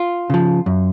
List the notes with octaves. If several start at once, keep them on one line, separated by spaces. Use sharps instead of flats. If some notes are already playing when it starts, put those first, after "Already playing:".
Already playing: F4
C#3 F3
F#2